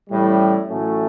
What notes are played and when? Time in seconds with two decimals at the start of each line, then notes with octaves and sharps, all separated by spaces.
0.10 A1 A2 G3
0.68 A1 A2 F#3 A3 C#4